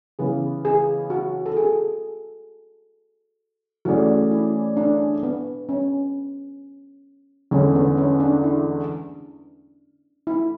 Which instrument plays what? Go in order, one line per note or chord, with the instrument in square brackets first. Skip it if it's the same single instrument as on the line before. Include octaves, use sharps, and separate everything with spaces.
[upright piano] C#3 E3 B3 [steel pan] G#4
[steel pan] G#4
F#4
A4
G#4
[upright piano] E3 A3 C#4 G#4 D5 [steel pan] F#4
[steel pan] E4
D4
B3
C#4
[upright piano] E2 D3 G#3 [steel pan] C#4
[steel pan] B3
C#4
D4
E4
E4